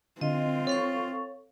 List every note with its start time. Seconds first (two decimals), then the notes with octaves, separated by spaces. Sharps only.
0.21 D3 C4 F4 D#5
0.67 A4 C#5 F5 C#6